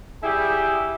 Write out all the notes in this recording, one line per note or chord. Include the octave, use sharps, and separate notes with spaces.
G3 E4 G4 G#4